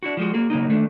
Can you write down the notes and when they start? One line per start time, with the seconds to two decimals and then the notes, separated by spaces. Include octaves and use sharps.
0.03 D4 E4 F#4
0.17 F3 G3 G#3 F#4
0.34 A#3 F#4 G#4
0.50 C#3 F#3 A#3 D#4
0.69 D#3 A3 D4